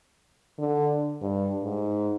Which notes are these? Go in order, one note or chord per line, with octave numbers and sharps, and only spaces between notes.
D3
G2
G#2